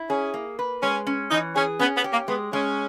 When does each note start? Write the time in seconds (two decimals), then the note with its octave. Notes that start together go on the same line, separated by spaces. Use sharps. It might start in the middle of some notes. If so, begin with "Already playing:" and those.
Already playing: E4
0.10 C#4 G#4
0.34 A#3
0.59 B4
0.83 G#3 C#4
1.07 C#4
1.31 E3 D#4
1.55 C#4 G#4
1.79 B3 C#4
1.96 B3
2.04 G4
2.12 A#3
2.28 G#3 B3
2.53 G#3 C#4